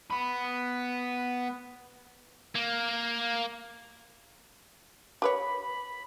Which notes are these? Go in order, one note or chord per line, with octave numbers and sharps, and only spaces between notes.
B3 B5
A#3
G4 B4 C#5 B5